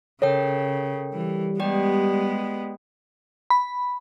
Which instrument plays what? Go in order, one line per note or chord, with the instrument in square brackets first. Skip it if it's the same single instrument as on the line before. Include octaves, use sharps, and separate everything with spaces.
[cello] C#3 [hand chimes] A4 A#4 G5 [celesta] C#5
[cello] E3 [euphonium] G3
[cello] G#3 B3 [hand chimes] G4 D5 G5
[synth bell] B5